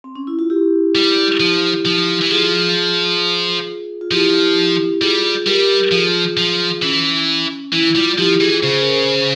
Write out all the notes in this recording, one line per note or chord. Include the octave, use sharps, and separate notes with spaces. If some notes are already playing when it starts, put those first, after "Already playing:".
C4
C#4
E4
F4
E4 G4
G3
F3
F3
E3
F3 F4 G#4
F4
F3 E4 G4
G3 F4 G#4
G3 G4 A#4
F3 F4 G#4
F3
E3 C#4
E3 E4
G3 F4
F3 E4 G4
E3 F4 G#4
C#3 G#4 C5
A#4
G#4 C5